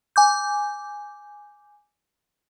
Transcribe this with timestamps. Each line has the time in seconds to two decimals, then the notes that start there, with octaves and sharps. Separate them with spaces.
0.16 G#5 D6 G6